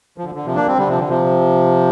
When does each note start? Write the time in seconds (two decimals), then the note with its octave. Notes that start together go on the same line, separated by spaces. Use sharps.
0.18 F3
0.24 D3
0.35 D3
0.45 C3 F3
0.56 A#3 D4
0.67 G3 C4
0.77 D3 G3
0.88 C3 F3
0.99 D3
1.09 C3 F3